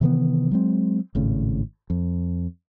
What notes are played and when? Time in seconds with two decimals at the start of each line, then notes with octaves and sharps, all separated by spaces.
0.01 C3 D#3 E3 B3
0.51 F#3 G#3 C4
1.15 G#1 A2 C#3
1.90 F2